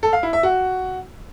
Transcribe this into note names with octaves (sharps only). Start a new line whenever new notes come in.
A4
F5
E4
E5
F#4